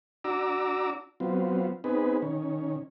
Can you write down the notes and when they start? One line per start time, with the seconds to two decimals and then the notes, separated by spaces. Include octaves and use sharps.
0.24 D4 F#4 A#5 D6 E6
1.20 F#3 B3 C4 F4
1.84 B3 C4 D#4 G#4 B4
2.22 D#3 C#4